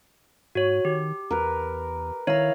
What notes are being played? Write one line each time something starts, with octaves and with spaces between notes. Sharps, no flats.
G#2 F#4 C#5
D#3 G4
E2 A#4 B4
D#3 E4 C#5 F5 A#5